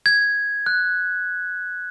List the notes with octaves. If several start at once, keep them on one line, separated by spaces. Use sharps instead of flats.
G#6
F#6